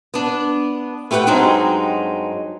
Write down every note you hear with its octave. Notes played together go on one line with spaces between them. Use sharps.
B3 D4
A3 G4 B4 C#5 F#5 G5
G2 F#3 G#3 C4 D#4